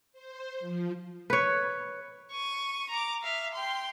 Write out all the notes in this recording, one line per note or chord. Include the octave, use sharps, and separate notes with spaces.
C5
F3
B4 C#5
C#6 D#7
A#5 D6
E5 F5
G5 C6